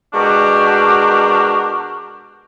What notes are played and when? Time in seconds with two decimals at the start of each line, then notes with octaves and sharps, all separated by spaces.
0.14 B2 G#3 D4 F#4 G4 A#4